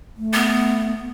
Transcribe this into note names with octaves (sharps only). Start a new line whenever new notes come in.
A3
B3